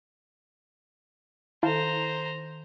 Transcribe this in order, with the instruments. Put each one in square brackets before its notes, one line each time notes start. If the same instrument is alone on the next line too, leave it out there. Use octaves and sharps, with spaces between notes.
[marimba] D#3 A4 [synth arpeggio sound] E4 F5 A5 [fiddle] C5 A#5